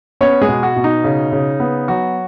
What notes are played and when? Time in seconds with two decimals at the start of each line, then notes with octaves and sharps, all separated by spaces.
0.21 B3 C#4 C#5
0.41 G#3 G#4
0.49 B2
0.63 F#4
0.76 B2
0.84 D#4
1.04 C#3
1.32 C#3
1.60 B3
1.88 F#3 F#4